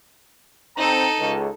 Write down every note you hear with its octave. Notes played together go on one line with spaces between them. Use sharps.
C4 D#4 A4 A#5
C#2